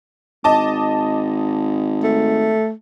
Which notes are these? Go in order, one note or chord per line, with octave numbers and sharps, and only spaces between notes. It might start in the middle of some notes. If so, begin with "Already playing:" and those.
G#1 D#5 A5 D6
A3